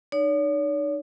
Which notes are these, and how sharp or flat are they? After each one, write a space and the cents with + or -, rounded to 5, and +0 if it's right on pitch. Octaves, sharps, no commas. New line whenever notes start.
D#4 -35 C#5 +45